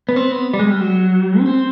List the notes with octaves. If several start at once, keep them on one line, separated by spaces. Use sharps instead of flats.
B3
C4
B3
G3
G#3
G3
F#3
C#4
C4